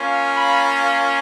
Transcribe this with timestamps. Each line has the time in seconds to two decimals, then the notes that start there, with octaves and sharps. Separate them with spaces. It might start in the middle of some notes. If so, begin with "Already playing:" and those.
Already playing: A#3 C#4 F4
0.33 B5